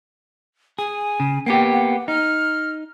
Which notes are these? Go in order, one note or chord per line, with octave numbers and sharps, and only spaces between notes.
G#4 G#5
C#3
A#3 B3 G4 G5
F#5
D#4 F6